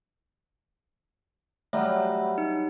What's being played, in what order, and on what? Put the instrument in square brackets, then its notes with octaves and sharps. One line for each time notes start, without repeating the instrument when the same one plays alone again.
[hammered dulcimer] F#3 G3 [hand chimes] A3 C#5 E5
[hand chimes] D#4